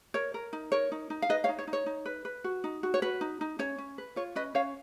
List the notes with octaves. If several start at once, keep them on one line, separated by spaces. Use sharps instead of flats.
A#4 C#5
A#4
D#4
A#4 C#5
D#4
D#4
F5
D#4 B4 D#5
C#5 F5
D#4
C#5
D#4
C#5
D#4
B4
B4
F#4
D#4
F#4
C#5
F#4 B4
D#4
D#4
C#4 C#5
C#4
B4
F4 C#5
C#4 B4 D#5
C#4 C#5 F5